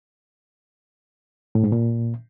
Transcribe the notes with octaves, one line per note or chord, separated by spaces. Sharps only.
A2
G#2
A#2